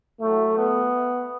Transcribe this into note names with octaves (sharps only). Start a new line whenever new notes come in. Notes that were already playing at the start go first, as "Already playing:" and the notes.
A2 F#3 A3
B3